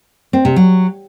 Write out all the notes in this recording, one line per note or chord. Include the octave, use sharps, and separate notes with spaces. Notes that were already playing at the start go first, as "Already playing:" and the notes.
C4
C3
F#3